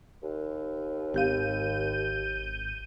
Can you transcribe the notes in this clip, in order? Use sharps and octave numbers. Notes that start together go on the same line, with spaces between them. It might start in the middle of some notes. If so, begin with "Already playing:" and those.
D#2
G#1 G4 F5 G6 D#7